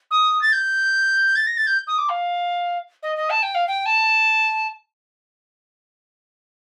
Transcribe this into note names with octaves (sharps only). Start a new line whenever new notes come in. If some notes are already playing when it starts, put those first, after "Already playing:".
D#6
A6
G6
A6
A#6
A6
G6
D#6
D6
F5
D#5
D#5
A5
G5
F5
G5
A5